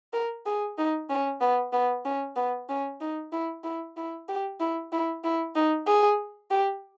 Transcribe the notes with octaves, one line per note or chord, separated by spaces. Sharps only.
A#4
G#4
D#4
C#4
B3
B3
C#4
B3
C#4
D#4
E4
E4
E4
G4
E4
E4
E4
D#4
G#4
G4